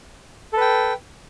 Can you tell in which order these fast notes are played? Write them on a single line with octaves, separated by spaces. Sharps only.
A4 B4 G5